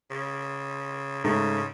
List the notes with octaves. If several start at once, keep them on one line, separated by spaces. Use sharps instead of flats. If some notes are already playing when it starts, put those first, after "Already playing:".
C#3
G#2 C#3 A3